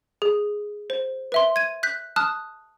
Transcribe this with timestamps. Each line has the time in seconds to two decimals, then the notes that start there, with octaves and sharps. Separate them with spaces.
0.22 G#4
0.90 C5
1.32 B4 E5 C6
1.56 G#6 D#7
1.83 F#6 G6 B6
2.16 A5 D#6 F6 F#6